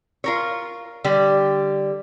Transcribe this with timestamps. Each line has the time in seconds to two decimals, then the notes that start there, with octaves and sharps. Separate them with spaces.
0.24 F4 A#4 C#5
1.04 D3 G3 G4